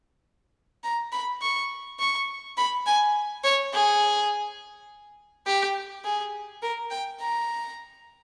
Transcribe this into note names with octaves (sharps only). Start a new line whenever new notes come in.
A#5
B5
C#6
C#6
B5
G#5
C#5
G#4
G4
G#4
A#4
G5
A#5